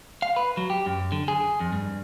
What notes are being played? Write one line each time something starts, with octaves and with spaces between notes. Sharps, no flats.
F5
B4
F#3
G4
F#2
D3
G#4
F2
G2